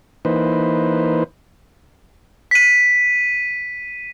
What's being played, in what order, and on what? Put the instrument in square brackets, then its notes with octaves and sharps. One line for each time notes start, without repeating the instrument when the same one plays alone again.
[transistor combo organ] E3 A#3 D#4 B4 C5
[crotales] B6 D#7